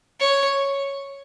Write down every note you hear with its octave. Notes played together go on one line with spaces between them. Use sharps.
C#5